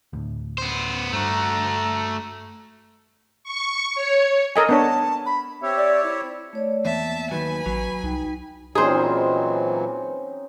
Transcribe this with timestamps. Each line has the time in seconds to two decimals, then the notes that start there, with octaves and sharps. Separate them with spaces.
0.13 D2 A2
0.58 B3 C5
1.13 G2 A3 F#4 A#5
3.44 C#6
3.95 C#5
4.56 A4 A#4 D#5 G#5
4.69 B3 D4 C#5 A5
5.26 B5
5.63 C4 G4 C#5 E5
5.76 D5
6.03 E4
6.53 A3 C#5 D5
6.85 E2 A#3 E5 A5
7.31 D#2 D#3 F#3 B4 G#5 B5
7.66 A1 F#3
8.03 C2 D#4 G5
8.75 A#2 E3 F#3 C4 C#4 D#4 G#4 C5